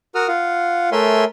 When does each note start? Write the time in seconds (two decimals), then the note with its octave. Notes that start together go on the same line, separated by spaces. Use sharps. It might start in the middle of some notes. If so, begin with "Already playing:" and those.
0.15 F#4 A#4 F#5 D#6 F6
0.28 F4 F5 F#5
0.92 A3 A#4 C#5 E5 G#5 C6